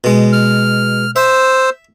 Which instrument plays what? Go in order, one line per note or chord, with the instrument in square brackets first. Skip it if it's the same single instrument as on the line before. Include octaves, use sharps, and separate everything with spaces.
[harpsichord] B2 G#3
[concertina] F6
[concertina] C5 E6 [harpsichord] E5